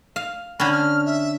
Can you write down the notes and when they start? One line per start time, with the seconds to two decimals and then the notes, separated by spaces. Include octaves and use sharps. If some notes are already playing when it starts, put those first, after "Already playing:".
0.16 F5
0.60 D3 C#4 B5
0.72 F6
1.06 E5